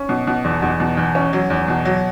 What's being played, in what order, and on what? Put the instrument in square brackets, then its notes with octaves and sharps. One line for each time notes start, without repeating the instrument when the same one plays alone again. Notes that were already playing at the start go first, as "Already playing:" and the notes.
Already playing: [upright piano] C#4
B2
B2
E2
E2
B2
E2
C#4
F#3
E2
B2
F#3